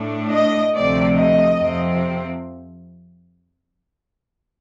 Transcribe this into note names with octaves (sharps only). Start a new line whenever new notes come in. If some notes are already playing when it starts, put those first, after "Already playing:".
Already playing: A2 A3 D4
D#5
D2 C3 F3 A3 C4 D5
D#5
F2 C3 F3 C4